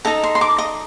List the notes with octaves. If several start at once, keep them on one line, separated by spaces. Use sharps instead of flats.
D#4 A4 D#5 A#5
C6
C6
D6
D#5